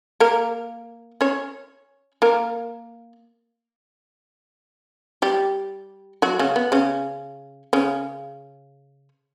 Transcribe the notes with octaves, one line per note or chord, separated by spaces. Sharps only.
A#3 A#4
C#4 C#5
A#3 A#4
G3 G4
F#3 F#4
C#3 C#4
B3
C#3 C#4
C#3 C#4